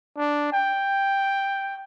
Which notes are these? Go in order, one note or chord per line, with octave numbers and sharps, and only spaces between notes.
D4
G5